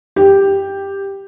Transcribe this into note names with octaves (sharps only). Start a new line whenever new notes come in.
G4